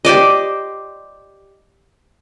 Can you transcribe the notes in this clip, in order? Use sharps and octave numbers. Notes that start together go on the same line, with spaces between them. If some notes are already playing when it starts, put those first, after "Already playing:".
G4 C5 D5 D#5